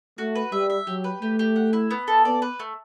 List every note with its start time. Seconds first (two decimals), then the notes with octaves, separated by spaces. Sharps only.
0.18 A3 F#4
0.35 B4
0.52 G3 E5
0.70 E5
0.87 F#3 G4
1.04 B4
1.21 A3 G4
1.39 G4
1.56 F#5
1.73 E4
1.91 B3
2.08 A4
2.25 B3 D5
2.42 B4
2.59 A3